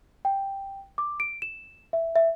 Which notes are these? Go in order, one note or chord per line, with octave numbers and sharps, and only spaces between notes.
G5
D6
D7
E7
E5
E5